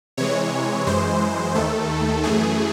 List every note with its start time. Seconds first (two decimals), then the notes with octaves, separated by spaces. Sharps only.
0.17 C3 E3 G#3 C#5
0.86 F#2 E3 G#3 C5
1.55 D#2 D#3 A3 A4
2.23 F#2 E3 A3 G#4